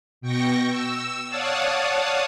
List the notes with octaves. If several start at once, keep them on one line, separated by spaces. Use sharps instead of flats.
B2 G5 C#6 A#6
E6
C#5 D5 F5 F#5 A5 D#6